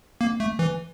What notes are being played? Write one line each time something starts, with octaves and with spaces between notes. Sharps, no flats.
A#3
A3
E3